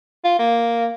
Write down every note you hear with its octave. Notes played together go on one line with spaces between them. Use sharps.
F4
A#3